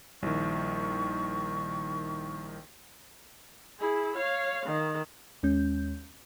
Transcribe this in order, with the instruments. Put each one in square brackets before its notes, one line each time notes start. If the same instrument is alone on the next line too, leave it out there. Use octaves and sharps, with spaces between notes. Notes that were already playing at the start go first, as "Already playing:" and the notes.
[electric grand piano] A#1 D#3 [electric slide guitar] G3 E4 E5 [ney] C#6
[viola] E4 G#4
C#5 F5
D#3
[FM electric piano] D#2 G#3 C#4 G6